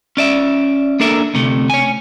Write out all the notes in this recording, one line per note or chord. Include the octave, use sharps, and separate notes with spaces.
C#4 D5 E5
A#3 D4 A4 A#4 E5
D2 C3 A3
C#5 G#5